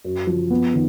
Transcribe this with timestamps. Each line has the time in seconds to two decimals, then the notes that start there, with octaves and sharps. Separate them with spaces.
0.05 F#2
0.27 F3
0.50 B3
0.74 D#3